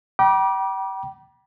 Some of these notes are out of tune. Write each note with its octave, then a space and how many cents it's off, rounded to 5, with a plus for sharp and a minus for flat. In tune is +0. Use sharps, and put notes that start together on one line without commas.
G5 -30 B5 -45 D6 +0